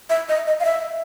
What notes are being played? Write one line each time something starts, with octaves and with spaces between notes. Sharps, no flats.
E5
D#5
D#5
F5
E5